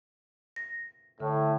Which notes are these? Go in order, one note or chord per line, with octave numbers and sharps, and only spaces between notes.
A#6
A2 D3